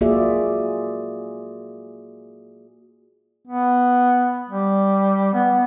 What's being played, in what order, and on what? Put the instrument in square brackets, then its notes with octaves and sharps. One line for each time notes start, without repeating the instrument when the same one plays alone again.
[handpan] A#3 F4 F#4 G#4 D5 E5
[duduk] B3
G3
B3